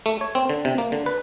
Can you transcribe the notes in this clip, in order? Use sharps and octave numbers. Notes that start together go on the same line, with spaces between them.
A3
C#5
C4
D3
C3
A#3
D3
B4